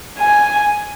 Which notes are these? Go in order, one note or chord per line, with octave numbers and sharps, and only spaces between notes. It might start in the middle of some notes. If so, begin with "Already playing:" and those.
G#5